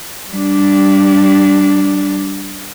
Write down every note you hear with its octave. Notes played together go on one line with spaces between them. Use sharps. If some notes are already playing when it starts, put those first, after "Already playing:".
G3 D4